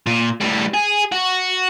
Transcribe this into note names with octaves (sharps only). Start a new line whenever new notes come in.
A#2
A2 G3
G#4
F#4